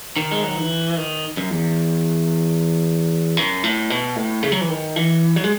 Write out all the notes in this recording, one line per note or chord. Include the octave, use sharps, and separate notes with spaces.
D#3
G#3
F#3
E3
D#3
F#2
E2
F#2
A2
B2
A2
C#3
F#3
E3
D#3
E3
F#3
G#3